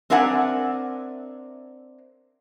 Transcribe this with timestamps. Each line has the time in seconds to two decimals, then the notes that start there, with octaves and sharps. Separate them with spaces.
0.10 C4 D4 A#4 E5 F#5 G#5